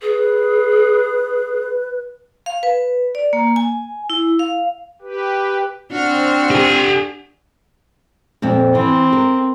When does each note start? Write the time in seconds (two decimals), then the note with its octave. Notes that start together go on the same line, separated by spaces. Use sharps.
0.01 G#4 B4
2.46 F5
2.63 B4
3.15 D5
3.33 A#3
3.56 G#5
4.10 E4
4.39 F5
5.02 G4 B4
5.92 C4 D4 F#4 F6
6.51 G4 G#5
8.42 F2 A#2 C4
8.75 E3 C4
9.13 A#4